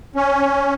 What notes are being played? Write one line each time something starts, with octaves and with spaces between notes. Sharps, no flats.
C#4